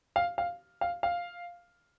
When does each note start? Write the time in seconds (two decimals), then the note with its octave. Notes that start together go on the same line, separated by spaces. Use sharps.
0.16 F5
0.38 F5
0.81 F5
1.03 F5